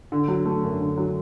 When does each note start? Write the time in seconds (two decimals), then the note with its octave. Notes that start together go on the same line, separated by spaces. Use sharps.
0.12 D3
0.28 F#3
0.46 A3
0.64 F#2
0.81 D3
0.98 F#3